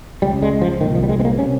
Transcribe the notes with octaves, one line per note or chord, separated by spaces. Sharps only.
C#2 C#3 G3
G#3
F3
C2 A#2 D#3
F3
G3
G#3
C4
A#3
C3 C#4